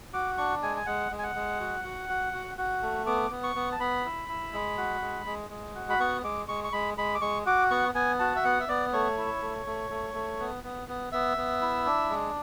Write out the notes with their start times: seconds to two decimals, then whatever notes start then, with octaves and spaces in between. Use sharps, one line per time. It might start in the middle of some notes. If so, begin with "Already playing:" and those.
0.13 F#4 D6
0.38 D4 C#6
0.62 G#3 G#5
0.77 G#5
0.86 G#3 F#5
1.12 G#3
1.19 G#5
1.23 F#5
1.35 G#3
1.60 F#4
1.84 F#4
2.09 F#4
2.33 F#4
2.58 F#4
2.82 A3
3.06 B3 D6
3.31 B3
3.43 C#6
3.56 B3
3.72 A5
3.80 B3 B5
4.05 E4
4.29 E4
4.53 G#3
4.77 F#4
5.02 G#3
5.26 G#3
5.50 G#3
5.75 F#4
5.90 B5
6.00 B3 C#6
6.24 G#3 D6
6.48 G#3 C#6
6.64 C#6
6.73 G#3 B5
6.98 G#3 B5
7.15 D6
7.21 G#3 C#6
7.46 F#4 D6
7.71 B3 C#6
7.95 B3 G#5
8.19 F#4 A5
8.36 E5
8.44 B3 F#5
8.60 E5
8.68 B3 D5
8.93 A3 C#5
9.17 E4
9.42 A3
9.66 A3
9.90 A3
10.14 A3
10.40 B3
10.64 B3
10.89 B3
11.12 B3 E5
11.37 B3
11.61 E4
11.86 D4
12.10 G#3